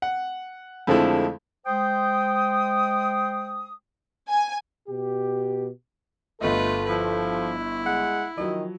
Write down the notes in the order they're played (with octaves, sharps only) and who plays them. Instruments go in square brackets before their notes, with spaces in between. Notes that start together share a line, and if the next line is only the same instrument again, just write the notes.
[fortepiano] F#5
F2 D3 F3 G#3 A3 E4
[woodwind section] G#3 C5 G5 D#6
[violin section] G#5
[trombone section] B2 G4
[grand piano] G1 D#5 [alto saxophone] A3 [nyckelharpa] F4 B4 [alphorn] A4
[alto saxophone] F3 [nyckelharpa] E4
[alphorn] G#3 [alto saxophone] F#5
[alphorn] D#3 [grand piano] F3 F#3 [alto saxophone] D#5